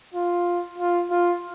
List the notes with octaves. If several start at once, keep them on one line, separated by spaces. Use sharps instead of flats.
F4
F4
F4